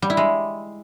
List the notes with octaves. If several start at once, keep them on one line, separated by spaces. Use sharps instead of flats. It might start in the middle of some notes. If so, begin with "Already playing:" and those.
G3
E4
G#3